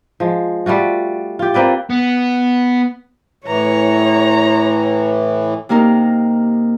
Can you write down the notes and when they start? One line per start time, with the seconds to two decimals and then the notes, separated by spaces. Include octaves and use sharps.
0.20 F3 G#3
0.66 G3 A3 F4 F#4
1.39 F4 G4
1.54 A#3 C4 B4 D5
1.90 B3
3.46 A2 E3 C#5 A#5
5.69 C3 A#3 D#4 A#4